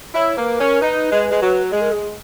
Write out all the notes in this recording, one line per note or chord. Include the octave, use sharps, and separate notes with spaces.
E4 C#5
A#3 B4
C#4 A#4
D#4 B4
G#3
G#3
F#3
G#3 G#4
A#4
G#3 G#4